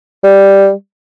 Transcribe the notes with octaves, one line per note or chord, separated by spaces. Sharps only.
G3